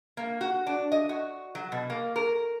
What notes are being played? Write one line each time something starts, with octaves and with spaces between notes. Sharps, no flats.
A#3
F#4
D4
D#5
F#4
F#3
B2
A#3
A#4